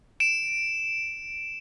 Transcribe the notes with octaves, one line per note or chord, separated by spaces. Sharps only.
D7 E7